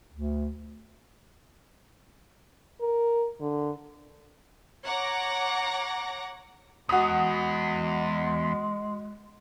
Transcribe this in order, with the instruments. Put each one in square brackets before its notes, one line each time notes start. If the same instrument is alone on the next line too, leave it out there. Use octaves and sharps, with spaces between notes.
[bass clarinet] D2
[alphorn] A#4
D3
[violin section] C#5 F#5 A#5 D6 A#6
[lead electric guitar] E2 [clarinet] G#3 [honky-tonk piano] F#4 D#6